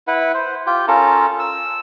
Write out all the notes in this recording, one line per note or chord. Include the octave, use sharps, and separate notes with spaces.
E4 B4 F#5
C5
F4 G4 G5
C#4 F4 A4 A#4
E6